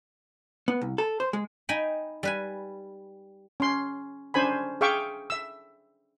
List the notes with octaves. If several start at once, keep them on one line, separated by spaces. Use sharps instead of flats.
B3
C2
A4
C5
G#3
D#4 D#5 G5 G#5 B5
G3 B4 G#5
C#4 C6
C#4 D4 C5 G#5 B5
G#4 E5 F5 G5 C#6 D6
E5 E6